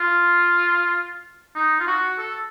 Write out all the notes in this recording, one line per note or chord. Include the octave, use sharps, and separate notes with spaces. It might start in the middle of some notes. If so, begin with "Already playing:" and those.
Already playing: F4
D#4
F4
F#4
A4